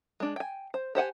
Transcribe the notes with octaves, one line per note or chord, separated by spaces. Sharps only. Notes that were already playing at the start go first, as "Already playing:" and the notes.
G#3 D4
G5 G#5
C5
G4 C5 F#5 G#5